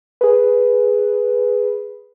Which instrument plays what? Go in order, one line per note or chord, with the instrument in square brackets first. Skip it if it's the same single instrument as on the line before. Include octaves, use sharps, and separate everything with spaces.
[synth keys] G#4 B4